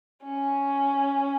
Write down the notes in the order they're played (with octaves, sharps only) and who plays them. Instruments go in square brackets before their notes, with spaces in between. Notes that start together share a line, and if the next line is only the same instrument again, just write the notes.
[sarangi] C#4